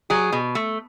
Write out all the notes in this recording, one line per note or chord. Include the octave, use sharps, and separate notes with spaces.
F#3 G#4
B2
A3